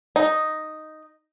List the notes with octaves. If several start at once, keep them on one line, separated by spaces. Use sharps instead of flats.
D#4